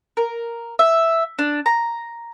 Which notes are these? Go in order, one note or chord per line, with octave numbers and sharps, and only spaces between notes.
A#4
E5
D4
A#5